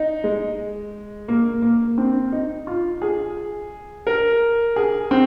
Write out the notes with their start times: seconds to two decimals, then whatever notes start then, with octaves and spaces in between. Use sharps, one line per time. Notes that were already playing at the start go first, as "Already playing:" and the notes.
Already playing: D#4
0.24 G#3
1.28 A#3
1.62 A#3
1.98 C4
2.32 D#4
2.67 F4
3.02 G#4
4.07 A#4
4.76 G#4
5.11 C4